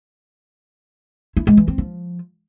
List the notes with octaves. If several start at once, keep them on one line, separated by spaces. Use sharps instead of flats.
E4
G#3
E3
C4
F3